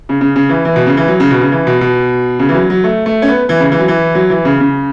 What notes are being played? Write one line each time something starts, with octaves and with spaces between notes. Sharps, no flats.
C#3
C#3
C#3
E3
E3
B2
C#3
E3
F#3
C#3
B2
C#3
E3
B2
B2
C#3
E3
F#3
F#3
A3
A3
C#4
B3
E3
C#3
E3
F#3
E3
F#3
E3
C#3
C#3